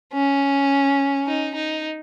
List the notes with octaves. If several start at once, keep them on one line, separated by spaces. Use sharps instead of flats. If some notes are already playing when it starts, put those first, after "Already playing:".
C#4
D#4
D#4